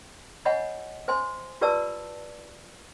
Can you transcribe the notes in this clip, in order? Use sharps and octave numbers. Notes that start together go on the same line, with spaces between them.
C#5 D#5 F#5 G#5 B5
C5 G#5 C6
F4 G4 B4 D5 A5 E6